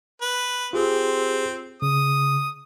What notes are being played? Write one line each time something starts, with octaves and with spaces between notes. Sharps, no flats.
B4
C4 F4 G4 G#4
C#3 D#6